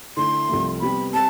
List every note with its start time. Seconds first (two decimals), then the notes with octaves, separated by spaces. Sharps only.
0.17 D3 A3 E4 C6
0.49 C2 C3 F3 A3
0.81 C3 G3 B3 B5
1.14 G3 C4 A5